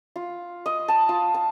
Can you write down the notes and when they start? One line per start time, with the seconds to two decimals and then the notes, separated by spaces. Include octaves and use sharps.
0.16 F4
0.66 D#5
0.88 A5
1.09 F4
1.34 A5